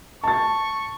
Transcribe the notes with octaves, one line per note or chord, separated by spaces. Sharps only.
A5 C#6 A6